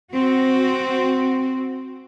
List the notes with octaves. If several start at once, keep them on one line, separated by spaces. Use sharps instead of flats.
C4 F#4